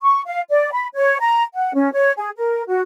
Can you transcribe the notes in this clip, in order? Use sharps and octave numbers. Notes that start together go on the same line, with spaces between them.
C#6
F5
D5
B5
C#5
A#5
F#5
C#4
C#5
G#4
A#4
F#4